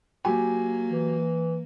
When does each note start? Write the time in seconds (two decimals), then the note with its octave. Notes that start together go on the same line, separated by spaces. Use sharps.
0.25 F#3 A#3 G4 G#5
0.91 E3